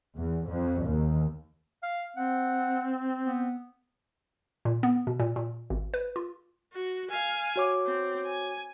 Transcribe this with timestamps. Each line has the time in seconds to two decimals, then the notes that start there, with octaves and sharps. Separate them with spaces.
0.16 E2
0.50 F2
0.84 D#2
1.83 F5
2.17 C4 F#5
3.24 B3
4.65 A#2
4.83 B3
5.07 B2
5.19 A#2
5.36 A#2
5.70 G#1
5.94 B4
6.16 F4
6.73 F#4
7.11 F5 G#5
7.56 F#4 C#5 D6
7.86 C4
8.26 G#5